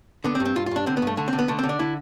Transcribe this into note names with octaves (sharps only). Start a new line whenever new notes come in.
D3 B3
C4
G2
C4
G2 F4
F4
G2 D4
D3 C4
B3
G2 A3
D3 A3
C4
D3
B3
D3 A3
C4
D3
D4
D3 E4